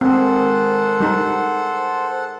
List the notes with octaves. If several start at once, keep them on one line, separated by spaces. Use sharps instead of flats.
G#2 D#3 C4 G#4 A4 C5 F#5
G3 D#4 A#4